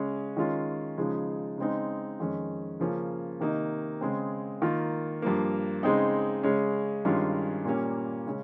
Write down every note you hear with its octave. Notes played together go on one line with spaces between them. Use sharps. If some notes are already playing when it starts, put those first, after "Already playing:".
Already playing: C#3 G#3 C#4
D#3 G#3 C#4 F4
C#3 F3 G#3 D#4
C#3 G#3 C4 D#4
F2 D#3 G#3 C#4
C#3 F3 A#3 C#4
C3 D#3 A#3 D#4
C#3 G#3 C4
D#3 A#3 F4
G2 F3 A#3
C#3 G#3 C4 D#4
C#3 G#3 C#4
G2 D#3 G#3 C#4 F4
A#2 G3 A#3 C#4
C#3 G#3 C#4